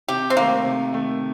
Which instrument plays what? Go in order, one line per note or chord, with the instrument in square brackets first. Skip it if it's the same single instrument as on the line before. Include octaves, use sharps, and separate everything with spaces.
[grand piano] C3 [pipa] G4
[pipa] C4
[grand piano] D#3 A3 [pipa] A#3
[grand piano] C3
D#3 A3